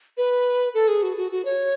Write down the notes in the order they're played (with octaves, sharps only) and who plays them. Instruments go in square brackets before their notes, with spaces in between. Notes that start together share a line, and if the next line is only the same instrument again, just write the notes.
[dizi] B4
A4
G#4
F#4
F#4
F#4
C#5